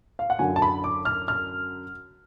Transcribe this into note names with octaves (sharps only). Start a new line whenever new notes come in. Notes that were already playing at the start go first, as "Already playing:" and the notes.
F5
F#5
F#2 D3 F#3 G#5
A5
B5
D6
F6
F6